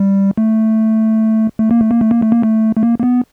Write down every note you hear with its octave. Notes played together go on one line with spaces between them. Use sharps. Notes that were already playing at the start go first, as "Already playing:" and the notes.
Already playing: G3
A3
A3
A#3
A3
A#3
A3
A#3
A3
A#3
A3
A3
A#3
A#3
B3